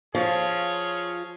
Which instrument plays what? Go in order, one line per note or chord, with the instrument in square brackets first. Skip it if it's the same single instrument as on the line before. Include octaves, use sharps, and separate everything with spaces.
[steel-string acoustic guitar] F3 [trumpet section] F4 G#4 C#5